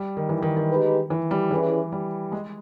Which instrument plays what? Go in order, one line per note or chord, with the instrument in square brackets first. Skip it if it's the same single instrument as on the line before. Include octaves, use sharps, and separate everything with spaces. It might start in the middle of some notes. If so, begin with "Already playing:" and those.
Already playing: [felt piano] G3
D#3
E3
D#3
D#3
[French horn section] G#3 D#4 G4 B4
[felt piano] E3
G3
[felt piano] E3 [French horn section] G3 C#4 E4 G#4 B4
[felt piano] G3
G#3